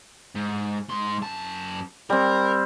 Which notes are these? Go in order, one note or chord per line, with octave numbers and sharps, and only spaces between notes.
G#2
G#2 C6
F#2 A5
G3 C4 A#4